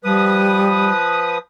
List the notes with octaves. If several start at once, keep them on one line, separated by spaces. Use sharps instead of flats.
F3 G3 B4 D#6